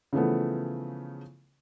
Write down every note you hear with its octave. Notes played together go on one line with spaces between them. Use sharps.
C#3 E3 F3 A3 B3